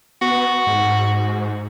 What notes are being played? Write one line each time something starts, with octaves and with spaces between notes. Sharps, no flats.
B3 F#4
G#2